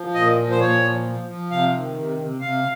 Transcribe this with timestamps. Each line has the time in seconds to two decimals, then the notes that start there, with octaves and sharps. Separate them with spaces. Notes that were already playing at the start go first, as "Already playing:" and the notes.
Already playing: F3
0.14 A#2 D#5
0.37 F3
0.51 C5
0.60 A#2 C#5
0.82 F3
1.05 F3
1.28 F3
1.51 C3 F5
1.74 D#3
1.97 C3
2.19 C3
2.41 C3 F5